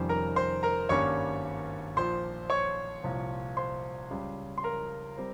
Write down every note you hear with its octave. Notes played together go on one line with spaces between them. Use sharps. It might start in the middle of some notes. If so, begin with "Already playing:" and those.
Already playing: F1 F2 D#3 G3 C#4 C5
A#4 A#5
C5 C6
A#4 A#5
G#1 G2 G3 A#3 C#4 C#5 C#6
A#1 A#2 F3 C5 C6
C#5 C#6
C2 A#2 F3
C5 C6
C#2 C#3 G3
C6
A#4 A#5
G3 C4